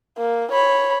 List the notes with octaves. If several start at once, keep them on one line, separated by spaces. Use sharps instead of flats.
A#3
C#5 B5